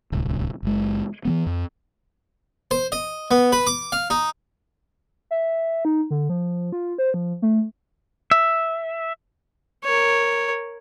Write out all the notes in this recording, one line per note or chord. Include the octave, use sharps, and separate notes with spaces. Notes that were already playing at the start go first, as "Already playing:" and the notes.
D1 C2
F#1 G#3
E3 F#3 B3
F2
C5
D#5
B3
B4
D6
F5
D#4
E5
D#4
D3
F3
F4
C5
F3
A3
E5
A#4 C#5